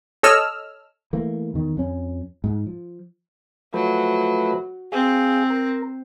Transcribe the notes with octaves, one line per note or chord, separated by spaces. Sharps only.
A4 C#5 D#5 E6 F6
E3 A3 A#3
E2 D#3
F2 C#4
G#2
F3
F3 F#3 A3 B4
C4 G#4 F5
A#4